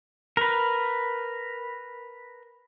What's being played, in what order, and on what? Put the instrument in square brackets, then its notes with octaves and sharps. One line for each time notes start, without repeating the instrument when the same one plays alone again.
[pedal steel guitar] A#4 B4